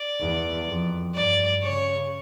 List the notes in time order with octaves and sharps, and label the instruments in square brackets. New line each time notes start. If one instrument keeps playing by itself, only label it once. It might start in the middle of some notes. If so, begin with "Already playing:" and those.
Already playing: [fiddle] D5
[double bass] E2
F2
[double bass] G2 [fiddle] D5
[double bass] C#3 [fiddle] C#5